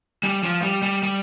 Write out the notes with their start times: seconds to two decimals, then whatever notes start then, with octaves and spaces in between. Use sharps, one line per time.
0.23 G3
0.43 F3
0.62 G3
0.82 G3
1.03 G3